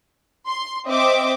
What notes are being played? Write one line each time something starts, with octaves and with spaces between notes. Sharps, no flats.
C6
C4 D#5 E5 D6